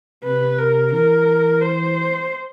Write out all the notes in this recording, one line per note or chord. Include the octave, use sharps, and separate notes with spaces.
C3 B4
A#4
E3 A#4
C5